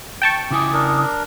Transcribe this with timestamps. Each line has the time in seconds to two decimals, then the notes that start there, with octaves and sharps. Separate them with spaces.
0.22 G5 A5 C#6
0.51 C#3 E4 G#5 D6 D#6
0.74 D4 A#4